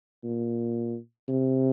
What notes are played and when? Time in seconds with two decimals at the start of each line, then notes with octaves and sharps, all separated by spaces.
0.24 A#2
1.28 C3